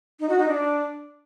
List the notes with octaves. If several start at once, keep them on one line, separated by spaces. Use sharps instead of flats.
D#4
F#4
D#4
D4